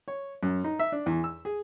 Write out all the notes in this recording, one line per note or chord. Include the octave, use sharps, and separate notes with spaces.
C#5
F#2
D#4
E5
D4
E2
E6
G#4